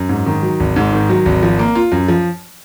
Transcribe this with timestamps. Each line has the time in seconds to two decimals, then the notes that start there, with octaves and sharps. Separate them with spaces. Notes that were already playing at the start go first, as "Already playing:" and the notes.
Already playing: F#2
0.09 G#2
0.26 D#3
0.43 F#3
0.60 G#1
0.76 G#2
0.93 D#3
1.09 F#3
1.26 G#1
1.42 F3
1.59 A#3
1.75 F4
1.92 F#2
2.08 F3